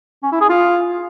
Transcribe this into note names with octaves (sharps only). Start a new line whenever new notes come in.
C#4
E4
G#4
F4